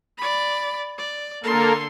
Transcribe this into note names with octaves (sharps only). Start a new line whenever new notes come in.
D5 B5
D5
D3 A#3 A4 A#4 C6